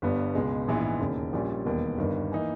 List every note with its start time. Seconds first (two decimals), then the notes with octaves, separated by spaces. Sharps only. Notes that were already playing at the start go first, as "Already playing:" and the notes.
0.02 G1 G2 G3 B3
0.35 C#2 B2 G#3
0.68 A#1 G#2 E3 G#3 B3
1.00 E1 D#2 C#3
1.33 A#1 A#2 G3 C#4
1.65 E1 D#2 D#3 G3 B3
1.98 G1 G2 D#3
2.32 E3 A#3 D#4